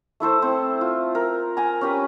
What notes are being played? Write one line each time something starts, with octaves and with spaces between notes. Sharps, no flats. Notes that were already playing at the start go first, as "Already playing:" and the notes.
A3 E4 A4 C5
C4
F4
A#4
G#5 A#5
C#4 G4 B4